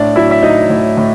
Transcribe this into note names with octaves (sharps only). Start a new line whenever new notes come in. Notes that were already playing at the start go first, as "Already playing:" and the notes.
Already playing: A2 D4 D5
F#3 E4 E5
E5
F#3 D#4 D#5
A2
A2